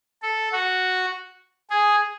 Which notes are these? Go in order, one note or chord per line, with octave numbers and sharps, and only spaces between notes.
A4
F#4
G#4